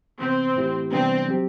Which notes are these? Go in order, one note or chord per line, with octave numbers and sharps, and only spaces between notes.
C3 E3 B3 C4
A2 E3 A3 E4 G4
C3 E3 G3 B3 C4 D4
F#3 C4 G4